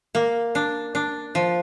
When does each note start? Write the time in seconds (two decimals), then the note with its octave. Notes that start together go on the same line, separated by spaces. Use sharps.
0.15 A#3
0.55 D4
0.95 D4
1.35 F3